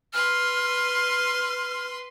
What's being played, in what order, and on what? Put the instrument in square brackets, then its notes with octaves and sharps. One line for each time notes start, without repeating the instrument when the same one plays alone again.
[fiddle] B4 C6 [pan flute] F6